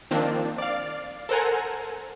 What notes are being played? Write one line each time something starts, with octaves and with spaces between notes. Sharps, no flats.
D#3 F3 A#3 C4 D4
D5 F5
A4 A#4 C5 F#5 G#5 A#5